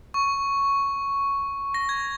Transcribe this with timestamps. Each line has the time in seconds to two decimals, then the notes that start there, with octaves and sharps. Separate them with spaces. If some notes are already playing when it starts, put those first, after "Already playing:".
0.14 C#6
1.74 A#6
1.89 G#6